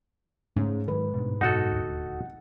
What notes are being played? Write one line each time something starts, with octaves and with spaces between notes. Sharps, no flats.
G#2 C#3 A3
D#3 F#3 B4
G2 B2
F#2 B2 D#4 F#4 A4 F#5
D#1 D2